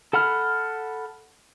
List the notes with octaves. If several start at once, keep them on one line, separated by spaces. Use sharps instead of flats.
A4 F#5 B5 F6